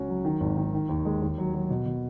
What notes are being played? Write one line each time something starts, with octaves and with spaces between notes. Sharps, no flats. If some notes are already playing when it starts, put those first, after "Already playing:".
Already playing: C#2 C#4 F#4
F#3
D#3
G#1
D#3
D#3
D#2
G#3
D#2
F#3
F#3
B2
B2